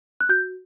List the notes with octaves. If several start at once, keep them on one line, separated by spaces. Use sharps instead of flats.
F#6
F#4 G6